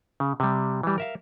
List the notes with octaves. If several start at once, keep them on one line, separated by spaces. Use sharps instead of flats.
C#3
C3 G3
E3 G3
A#4 E5 F5